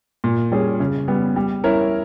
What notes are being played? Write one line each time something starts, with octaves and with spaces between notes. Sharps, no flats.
A#2
G3 C#4 G#4
C#3
G3 B3
G3
C#4 E4 A#4 C#5